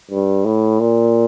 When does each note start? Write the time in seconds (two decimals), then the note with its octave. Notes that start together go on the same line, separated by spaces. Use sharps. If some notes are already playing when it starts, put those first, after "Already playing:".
0.11 G2
0.45 A2
0.80 A#2